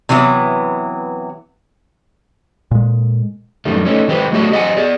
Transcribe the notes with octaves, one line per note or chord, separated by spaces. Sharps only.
C3 E3 F#3 B3 E4
A#2 G#3
F#2 D#3 G3 A3
A3 C#4 D#4
D#3 G#3 C4 G4 B4
F#3 A3 D4 F#4 G#4 D#5
G4 D#5 F#5 G#5
G#4 D5